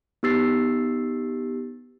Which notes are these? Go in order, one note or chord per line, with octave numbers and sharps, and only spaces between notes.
B3 D#4 G4 E6 A6 C7